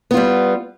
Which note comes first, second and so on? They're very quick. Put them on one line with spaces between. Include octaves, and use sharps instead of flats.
B3 F4 G3